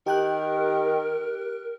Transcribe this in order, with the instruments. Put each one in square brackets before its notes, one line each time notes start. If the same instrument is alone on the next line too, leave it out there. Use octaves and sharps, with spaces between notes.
[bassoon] D#3 [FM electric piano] G4 G5 F#6 [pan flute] A#4